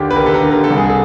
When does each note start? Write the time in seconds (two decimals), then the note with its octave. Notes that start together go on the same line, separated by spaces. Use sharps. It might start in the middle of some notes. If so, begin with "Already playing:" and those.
Already playing: D#2 D3 G4
0.11 B4
0.16 D#2 A#4
0.26 A4
0.34 A#4
0.43 D3
0.51 A#4
0.64 A4
0.70 C2
0.78 G#4
0.90 A4